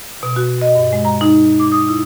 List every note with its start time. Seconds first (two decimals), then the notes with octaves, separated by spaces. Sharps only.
0.23 B2
0.36 F#4
0.61 D#5
0.75 G2
0.93 G#3
1.05 A#5
1.21 D#4
1.59 D6
1.72 D#6
1.89 E4